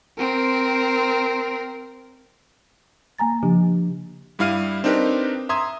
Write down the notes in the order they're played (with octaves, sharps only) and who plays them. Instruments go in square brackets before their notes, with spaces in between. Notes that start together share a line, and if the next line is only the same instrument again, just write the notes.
[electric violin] C4 A#4
[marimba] A#3 G#5 A#5 A6
C#3 F3 D4 G4
[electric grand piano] G2 G3 E4 F5 F6 D#7
C4 D4 D#4 G4 A#4 B4
E5 A#5 C6 D#6 G#6